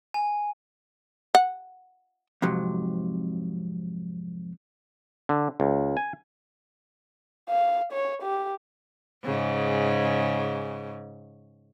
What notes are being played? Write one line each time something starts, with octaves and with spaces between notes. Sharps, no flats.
G#5
F#5
F2 G#2 C3 F#3
D3
C#2
G#5
F5
C#5
G4
G#2 C#3